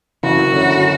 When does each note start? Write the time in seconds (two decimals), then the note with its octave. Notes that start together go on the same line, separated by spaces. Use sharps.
0.24 F#1 F#4
0.52 F#2 D3 F#3